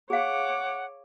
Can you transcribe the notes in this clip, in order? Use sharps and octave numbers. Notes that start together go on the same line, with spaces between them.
G#4 C#5 F5 F#5 D6